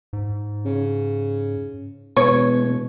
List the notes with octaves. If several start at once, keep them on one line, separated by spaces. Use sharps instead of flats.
G#2
C#3
E1 B2 B3 C#5